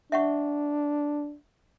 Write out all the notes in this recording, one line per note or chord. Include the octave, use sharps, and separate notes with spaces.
D4 E5 F#5 C#6